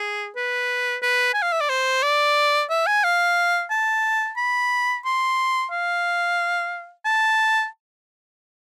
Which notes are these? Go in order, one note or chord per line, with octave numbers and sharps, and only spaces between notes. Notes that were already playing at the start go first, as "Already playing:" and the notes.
Already playing: G#4
B4
B4
G#5
F5
E5
D5
C5
D5
E5
G#5
F5
A5
B5
C6
F5
A5